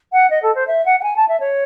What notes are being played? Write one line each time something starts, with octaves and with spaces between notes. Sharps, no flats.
F#5
D#5
A4
C5
E5
F#5
F#5
G#5
A5
E5
C#5